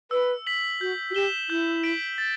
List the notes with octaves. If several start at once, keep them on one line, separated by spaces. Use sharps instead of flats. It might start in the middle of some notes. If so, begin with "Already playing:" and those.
B4 E6
B6 F#7
F#4 G6
F#4
G4 B6 E7 G7
E4 G6
B6 D7 F#7
A6